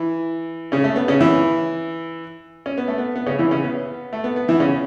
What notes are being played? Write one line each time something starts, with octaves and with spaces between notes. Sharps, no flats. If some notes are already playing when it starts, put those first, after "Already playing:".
Already playing: E3 E4
C#3 C#4
A3
B3
C#3 C#4
E3 E4
C#4
B3
A3
B3
B3
C#3 C#4
E3 E4
C#3 C#4
B3
A3
B3
B3
E3 E4
C#3 C#4